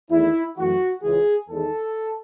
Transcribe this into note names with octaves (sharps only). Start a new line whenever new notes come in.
E2 D#3 A3 E4
F#2 E3 A3 F#4
C#2 C#3 E3 G#3 G#4
E2 D#3 G#3 A4